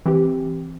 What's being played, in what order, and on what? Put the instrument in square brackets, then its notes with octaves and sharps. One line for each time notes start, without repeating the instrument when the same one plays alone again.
[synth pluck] E3 C4 G4